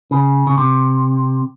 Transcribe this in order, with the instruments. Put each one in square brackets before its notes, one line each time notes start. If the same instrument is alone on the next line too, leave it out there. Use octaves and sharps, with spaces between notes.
[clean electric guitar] C#3
C#3
C3